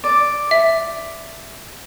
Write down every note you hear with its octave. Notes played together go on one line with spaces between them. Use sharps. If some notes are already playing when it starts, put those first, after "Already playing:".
D5
E5